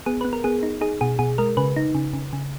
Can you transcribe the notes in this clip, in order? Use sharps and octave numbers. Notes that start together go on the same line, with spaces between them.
B3 G#4
B3 B4
A#4
B3 G#4
D#4
D#4 G#4
B2 G#4
B2 G#4
G#3 A#4
C#3 B4
D#4
C#3
C#3
C#3